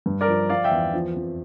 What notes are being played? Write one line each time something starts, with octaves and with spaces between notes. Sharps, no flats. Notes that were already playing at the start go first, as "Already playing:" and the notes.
G2
A#4 D5
F3
F3 D5 F5
E5 G5
E2
F3
F2